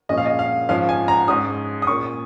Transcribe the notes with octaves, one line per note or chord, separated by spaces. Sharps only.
A#2 F3 G#3 C#4 D#5
F5
D#5
F5
G#2 F3 C#4 F5
G#5
A#5
G#2 G#3 C#4 D#6
D#6
A#2 A#3 C#4 C#6